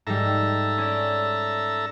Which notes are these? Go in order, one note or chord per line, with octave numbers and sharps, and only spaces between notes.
G#2 G3 A4 E5 A#5
C#4 D5